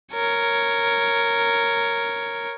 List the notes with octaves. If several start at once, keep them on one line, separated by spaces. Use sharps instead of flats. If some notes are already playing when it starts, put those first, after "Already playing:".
A#4 C#5